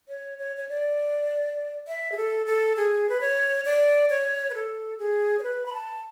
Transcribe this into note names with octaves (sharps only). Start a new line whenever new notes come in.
C#5
C#5
C#5
D5
E5
G#4
A4
A4
G#4
B4
C#5
D5
C#5
B4
A4
G#4
C#5
B4
B5
A5